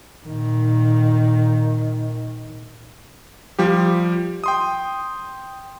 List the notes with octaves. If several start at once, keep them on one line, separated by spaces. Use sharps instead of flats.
A#2 D#3
F3 G3 G4
G5 C6 D#6